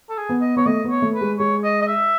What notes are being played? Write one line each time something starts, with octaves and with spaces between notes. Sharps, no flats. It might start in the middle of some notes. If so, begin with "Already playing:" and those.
A4
G#4
B3
D#5
B3 C#5
A3 D#5
B3
C#5
A3
B4
G#3
G#3 C#5
D#5
D#5
E5